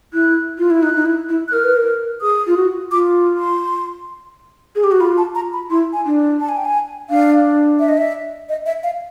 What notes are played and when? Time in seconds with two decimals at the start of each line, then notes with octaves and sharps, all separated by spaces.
0.13 E4 F#6
0.58 F4
0.70 E4
0.82 D#4 F#6
0.96 D#4
1.06 E4
1.29 E4
1.48 F#6
1.52 A#4 F6
1.64 B4
1.77 A#4
2.21 G#4 D#6
2.47 F4
2.56 F#4
2.91 F4 D6
3.38 C6
4.75 G#4
4.84 G4
4.91 F#4
5.00 F4 B5
5.17 A5
5.35 A#5
5.53 B5
5.70 E4 C6
5.93 G#5
6.06 D4
6.40 A5
6.49 G#5
6.57 G5
6.65 G#5
7.10 D4 F5
7.79 E5
7.89 D#5
7.97 E5
8.49 D#5
8.66 E5
8.83 F5